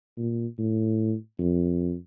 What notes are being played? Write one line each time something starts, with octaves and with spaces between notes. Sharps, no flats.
A#2
A2
F2